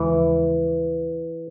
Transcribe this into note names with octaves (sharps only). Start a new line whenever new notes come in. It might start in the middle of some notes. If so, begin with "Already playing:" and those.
Already playing: D#2 C#3 E3 F3 G#3